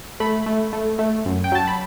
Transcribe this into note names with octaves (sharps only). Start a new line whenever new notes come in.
A3 B5
A3
A3
A3
F#2
G5
F#3 A5
B5